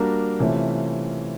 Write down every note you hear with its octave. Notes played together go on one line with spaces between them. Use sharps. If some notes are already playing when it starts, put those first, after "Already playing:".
Already playing: G3 A#3 D4 F#4 A#4
C3 E3 A3 C#4 F4